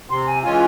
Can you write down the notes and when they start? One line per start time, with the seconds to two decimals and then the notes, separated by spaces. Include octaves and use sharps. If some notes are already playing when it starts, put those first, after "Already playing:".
0.10 C3 C6
0.26 G#5
0.43 E3 G#3 C#4 F4 G#5